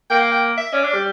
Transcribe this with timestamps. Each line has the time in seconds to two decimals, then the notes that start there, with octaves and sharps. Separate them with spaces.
0.10 A#3 G5
0.20 F5
0.31 G5
0.57 E5
0.73 C#4 D5
0.83 D4
0.94 G3